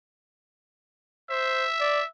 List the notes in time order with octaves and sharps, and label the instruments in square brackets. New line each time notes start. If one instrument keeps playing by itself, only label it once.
[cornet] C5 [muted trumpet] E5
[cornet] D5